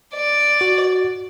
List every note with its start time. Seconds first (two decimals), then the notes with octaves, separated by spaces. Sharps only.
0.14 D5
0.61 F#4